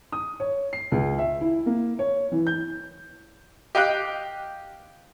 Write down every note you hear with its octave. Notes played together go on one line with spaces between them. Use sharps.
D#6
C#5
C7
C#2
E5
E4
A#3
C#5
E3
G6
G4 D#5 F5 G5 F#6